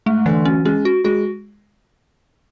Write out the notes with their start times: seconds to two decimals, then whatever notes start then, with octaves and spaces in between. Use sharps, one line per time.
0.06 G#2 A3
0.26 D3 E3
0.45 F#3 C#4
0.65 G#3 C#4
0.85 F#4
1.04 G#3 F#4